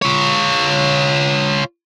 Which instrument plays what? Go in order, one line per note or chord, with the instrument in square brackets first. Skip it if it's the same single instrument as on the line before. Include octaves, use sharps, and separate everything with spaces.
[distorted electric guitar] F4 C#5